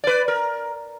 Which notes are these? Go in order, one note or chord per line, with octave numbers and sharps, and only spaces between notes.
B4 D5
A#4